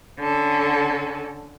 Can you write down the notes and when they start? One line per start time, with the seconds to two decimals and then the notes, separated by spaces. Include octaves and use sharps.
0.18 D3 C#4 A4